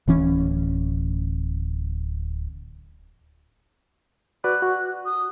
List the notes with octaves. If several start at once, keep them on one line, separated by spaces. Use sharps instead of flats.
D1 E3 C#4
F#4 B4 D5 F#6
F#4
D#6